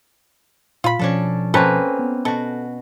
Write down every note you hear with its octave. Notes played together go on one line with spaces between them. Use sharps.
A#2 F4 B5
B2 F3 C#4 D4 A4
A#3 C4 C#4 A4 B4
B3
B2 F#4 A4